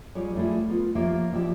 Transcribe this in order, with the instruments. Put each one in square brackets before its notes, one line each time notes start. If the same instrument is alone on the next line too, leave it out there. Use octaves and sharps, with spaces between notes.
[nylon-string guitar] G3 F4 G#4 C#5
G3 A3 E4 F4 G#4
B3 F4
F3 A#3 F4 G4 C#5 E5
G2 F3 E4 G4